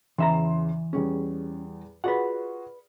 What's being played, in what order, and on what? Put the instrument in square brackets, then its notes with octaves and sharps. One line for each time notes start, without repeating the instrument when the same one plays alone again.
[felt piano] E2 C#3 C6 [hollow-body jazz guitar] E3 E5 A#5
[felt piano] E2 G3 G#4 [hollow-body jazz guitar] C#4
[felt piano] F4 F#4 G#4 [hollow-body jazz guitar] B4 D5 F#5